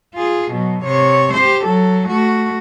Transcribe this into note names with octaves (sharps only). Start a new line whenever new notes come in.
F4 G#4
B2 F#3
C3 C#5
G4 C5
F#3 A4
A3 F#4